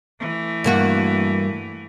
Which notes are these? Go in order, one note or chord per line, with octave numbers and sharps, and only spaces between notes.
E3 A3
G2 A#3 F#4